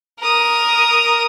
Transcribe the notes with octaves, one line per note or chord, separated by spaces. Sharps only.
A#4 D#6